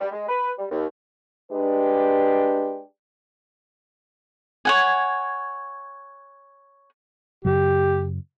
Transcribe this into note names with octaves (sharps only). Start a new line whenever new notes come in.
G3
G#3
B4
G3
D#2
G#3 D4 G4 B4
C#5 F#5 G#5
F#2 C#3 F#3 G4